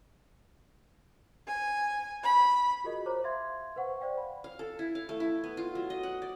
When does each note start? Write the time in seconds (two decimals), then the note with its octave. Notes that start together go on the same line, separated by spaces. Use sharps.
1.47 G#5
2.23 B5
2.84 F4 F#4 G#4 A#4 D#5
3.06 C5 C#5 A#5 D6
3.24 E5 F5 C6 G#6
3.76 B4 C5 F#5 C#6
4.01 C5 D5 F5 G5
4.17 B5
4.44 F5
4.59 A4
4.79 E4
4.95 F5
5.09 A3
5.20 E4
5.44 B3
5.57 F4
5.75 F#3
5.90 D#5
6.03 F#5
6.22 D5